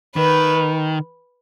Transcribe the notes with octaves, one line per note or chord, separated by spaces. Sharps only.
D#3 B4